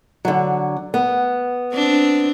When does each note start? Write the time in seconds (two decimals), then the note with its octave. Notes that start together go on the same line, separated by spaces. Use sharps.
0.25 D3 F#3
0.94 B3
1.73 C4 D4